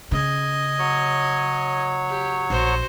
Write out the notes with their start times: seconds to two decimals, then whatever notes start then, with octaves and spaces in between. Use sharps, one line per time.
0.12 C#3 D#5 G#5
0.79 F#3 C#5
2.08 G4
2.50 A#1 F#4 C5